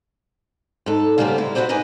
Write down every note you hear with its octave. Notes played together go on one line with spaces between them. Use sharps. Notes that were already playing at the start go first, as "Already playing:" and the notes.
G#2 A4
C#3 G3 A#3 B3 C5
G#3 E4
E4 F#4 G#4 B4 C5 D5
G#2 A#3 B4 D#5 G#5